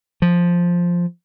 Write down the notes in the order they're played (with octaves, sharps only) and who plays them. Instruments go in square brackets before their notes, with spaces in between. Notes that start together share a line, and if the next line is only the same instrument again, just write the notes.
[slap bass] F3